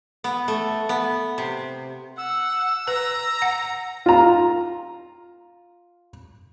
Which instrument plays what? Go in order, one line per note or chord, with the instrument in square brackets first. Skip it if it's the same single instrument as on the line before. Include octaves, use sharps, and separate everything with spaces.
[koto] B3
A3
B3
C3
[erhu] F#5 [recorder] E6
[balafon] B4 [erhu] A#5
[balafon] F#5
[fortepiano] F4 A#5